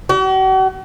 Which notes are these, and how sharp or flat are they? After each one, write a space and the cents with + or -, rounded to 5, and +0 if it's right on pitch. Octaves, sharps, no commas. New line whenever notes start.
F#4 +45